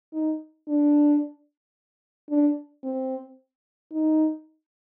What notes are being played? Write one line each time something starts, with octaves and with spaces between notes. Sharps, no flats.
D#4
D4
D4
C4
D#4